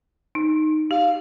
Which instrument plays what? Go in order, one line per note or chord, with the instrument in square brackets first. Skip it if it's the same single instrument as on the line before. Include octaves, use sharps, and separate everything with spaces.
[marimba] D#4
[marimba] G4 [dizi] F5